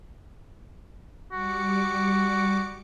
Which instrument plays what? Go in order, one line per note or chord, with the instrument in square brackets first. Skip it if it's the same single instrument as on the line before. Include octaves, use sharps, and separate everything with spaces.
[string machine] G3 D6 C#7 [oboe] F#4